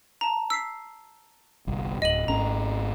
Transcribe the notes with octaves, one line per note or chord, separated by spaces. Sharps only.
A5 A#5
E6 B6 C7
G1 C2
D1 D#5 D#7 F#7
G#1 C#4 A#5